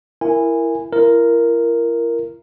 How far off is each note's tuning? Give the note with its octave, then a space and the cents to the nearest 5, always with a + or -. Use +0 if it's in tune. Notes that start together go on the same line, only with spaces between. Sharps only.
E4 +15 A#4 +0 G#5 -15
E4 +40 A#4 +0